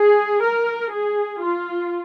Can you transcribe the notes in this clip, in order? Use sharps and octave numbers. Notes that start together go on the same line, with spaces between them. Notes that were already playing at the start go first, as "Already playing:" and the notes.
Already playing: G#4
A#4
G#4
F4